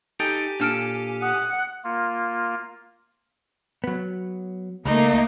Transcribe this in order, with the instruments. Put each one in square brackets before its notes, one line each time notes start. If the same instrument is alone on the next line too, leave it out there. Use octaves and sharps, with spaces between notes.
[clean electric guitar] D#4 A4 G5 [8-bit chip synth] G4 G#5
[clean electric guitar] A#2 A4 [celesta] D4 F6 D7
[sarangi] F#5 [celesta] D#6
[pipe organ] A#3 F4
[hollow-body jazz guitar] F#3 B3
[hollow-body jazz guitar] C#2 [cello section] A3 A#3 [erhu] D#4